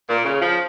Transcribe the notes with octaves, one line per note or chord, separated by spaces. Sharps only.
A#2
C#3
F3